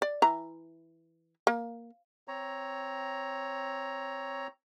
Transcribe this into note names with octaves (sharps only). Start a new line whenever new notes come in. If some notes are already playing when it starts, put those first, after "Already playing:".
D5
E3 A#5
A#3
C4 C#5 A#5